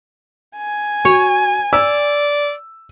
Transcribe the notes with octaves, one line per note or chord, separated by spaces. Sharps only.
G#5
F#4 C#5
D5 E6